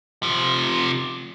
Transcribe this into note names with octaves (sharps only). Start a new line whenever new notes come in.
C3 F3